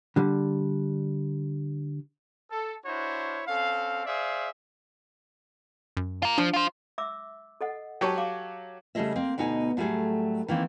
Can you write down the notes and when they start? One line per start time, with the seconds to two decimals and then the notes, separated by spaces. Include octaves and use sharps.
0.16 D3 G3
2.51 A4
2.85 D4 E4 F#4 C5 C#5
3.47 C4 C#4 A4 F5
4.06 G#4 C5 D5 E5 F5
5.97 F#2
6.23 F4 A#4
6.38 F3 D4
6.54 F4 C5
6.98 E5 D6 E6
7.61 A4 D#5 F#5
8.01 F#3 G4 C#5 G5 A5
8.18 F5 D6
8.95 C#3 G3 A3 G#4 D#5 E5
9.16 A#3 C4 A#4 G5
9.38 D2 B2 D#4 F#5 G#5
9.77 A2 F#3 G3 A3 G#4 A4
10.48 D#3 E3 A#3 C4